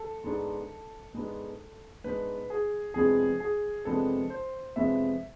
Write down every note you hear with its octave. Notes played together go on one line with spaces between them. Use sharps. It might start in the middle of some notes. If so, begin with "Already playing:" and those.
Already playing: A4
G#2 G#3 B3 D4
G#2 G#3 B3 D4
G#2 G#3 B3 D4 B4
G#4
F2 C3 G#3 B3 D4 G#4
G#4
F2 C3 G#3 B3 D4 A4
C5
F2 C3 G#3 B3 D4 E5